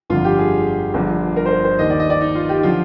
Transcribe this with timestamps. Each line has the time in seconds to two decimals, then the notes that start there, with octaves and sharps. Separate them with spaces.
0.10 G1 F2 D3 F4
0.24 G4
0.38 G#4
0.94 G1 G2 F3
1.36 A#4
1.46 C5
1.51 A#4
1.64 C5
1.79 D#2 D#3 D#5
1.90 D5
1.99 D#5
2.10 D5
2.21 D#4
2.35 F4
2.49 G4
2.58 D#4
2.63 D3 F3 F4